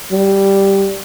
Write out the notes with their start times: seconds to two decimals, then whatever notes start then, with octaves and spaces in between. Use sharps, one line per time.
0.12 G3